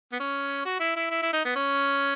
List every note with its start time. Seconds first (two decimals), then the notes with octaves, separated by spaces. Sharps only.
0.12 B3
0.20 C#4
0.65 F#4
0.80 E4
0.96 E4
1.11 E4
1.22 E4
1.33 D#4
1.45 B3
1.56 C#4